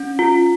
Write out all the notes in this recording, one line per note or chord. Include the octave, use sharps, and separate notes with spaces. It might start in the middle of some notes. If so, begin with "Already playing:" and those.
Already playing: C#4
F4